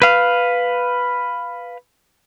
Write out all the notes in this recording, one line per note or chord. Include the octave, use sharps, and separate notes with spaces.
B4 F5